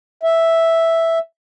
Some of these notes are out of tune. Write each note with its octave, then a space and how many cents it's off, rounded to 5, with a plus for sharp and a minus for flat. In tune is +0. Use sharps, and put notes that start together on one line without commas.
E5 +0